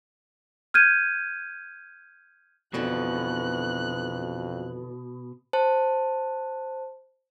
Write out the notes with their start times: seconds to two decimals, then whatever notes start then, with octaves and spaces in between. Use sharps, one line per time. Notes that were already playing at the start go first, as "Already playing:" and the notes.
0.74 F6 G6 G#6 D#7
2.74 F2 B2 D3 E3 B3 F#6
5.53 C5 A5